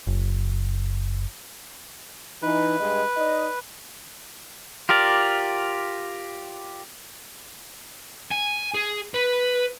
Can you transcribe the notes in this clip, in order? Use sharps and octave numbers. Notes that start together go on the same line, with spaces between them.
F#1
E3 D#4 B4
G2 G#3 D#5
D#4 D5 D#5
F4 G4 A#4 D5
G#5
G#4
B4